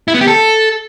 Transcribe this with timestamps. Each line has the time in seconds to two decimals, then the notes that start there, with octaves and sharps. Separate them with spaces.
0.08 E4
0.14 B3
0.21 G4
0.28 A4